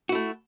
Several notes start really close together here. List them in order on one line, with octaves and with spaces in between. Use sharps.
F#4 E4 A3